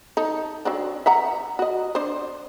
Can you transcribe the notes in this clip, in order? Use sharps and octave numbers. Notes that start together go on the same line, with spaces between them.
D#4 A4
F#3 C4 D4
E5 F#5 A#5
F#4 D#5
D4 C5